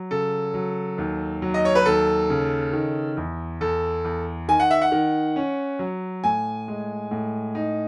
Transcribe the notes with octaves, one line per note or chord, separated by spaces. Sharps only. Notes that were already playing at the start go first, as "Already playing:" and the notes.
Already playing: F#3
C#3 A4
F#3
D#2
F#3
D#5
C#5
B4
D#2 A4
C#3
D#3
E2
E2 A4
E2
D#3 G#5
F#5
E5
F#5
D#3
C#4
F#3
A2 G#5
G#3
A2
D#4